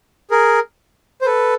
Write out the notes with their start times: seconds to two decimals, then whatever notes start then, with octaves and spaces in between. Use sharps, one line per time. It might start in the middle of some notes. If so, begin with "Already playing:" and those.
0.31 G#4 A#4
1.21 C5
1.26 A4 B4